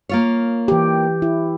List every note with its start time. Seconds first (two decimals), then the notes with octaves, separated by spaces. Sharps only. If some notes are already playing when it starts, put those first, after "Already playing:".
0.09 A#3 F4 C#5
0.68 E3 G4
1.22 E4